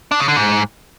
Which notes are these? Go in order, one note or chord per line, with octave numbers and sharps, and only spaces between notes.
D4
C#3
D3
G#2